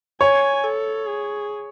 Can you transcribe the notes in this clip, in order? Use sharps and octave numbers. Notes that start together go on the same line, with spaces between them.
C#5 G#5
A4
G#4